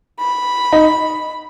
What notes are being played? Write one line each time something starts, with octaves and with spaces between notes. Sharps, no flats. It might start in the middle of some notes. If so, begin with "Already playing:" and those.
B5
D#4